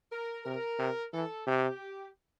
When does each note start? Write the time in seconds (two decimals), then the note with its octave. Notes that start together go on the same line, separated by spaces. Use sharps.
0.12 A#4
0.45 C3 A#4
0.79 C3
1.13 E3 A4
1.47 C3 G4